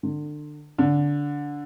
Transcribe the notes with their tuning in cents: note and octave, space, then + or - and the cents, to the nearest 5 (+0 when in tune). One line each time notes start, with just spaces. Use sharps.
D3 +30
D3 -15